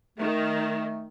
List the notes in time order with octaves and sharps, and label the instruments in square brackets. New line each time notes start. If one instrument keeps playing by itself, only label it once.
[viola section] D#3 [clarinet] A3